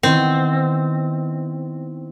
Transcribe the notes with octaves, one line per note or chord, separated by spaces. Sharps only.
D#3 B3 C4 E4